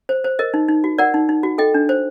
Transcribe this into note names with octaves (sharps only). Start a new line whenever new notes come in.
C5
C5
A#4 D#5
D#4
D#4
F#4
A#4 D5 F#5
D#4
D#4
F#4
A4 D#5 G5
D4
C5